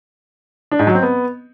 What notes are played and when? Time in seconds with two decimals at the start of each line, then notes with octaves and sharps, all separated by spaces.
0.71 D4
0.79 G#2
0.87 F#3
0.95 C4
1.03 B3